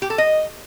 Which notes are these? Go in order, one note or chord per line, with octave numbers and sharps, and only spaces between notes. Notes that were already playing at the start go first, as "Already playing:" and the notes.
G4
A4
D#5